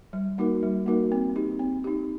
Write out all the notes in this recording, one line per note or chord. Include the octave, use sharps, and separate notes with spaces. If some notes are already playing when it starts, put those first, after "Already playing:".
G3
A#3 D#4 F#4 A#4
G3
A#3 D#4 F#4 A#4
C4
D#4 G4
C4
D#4 G4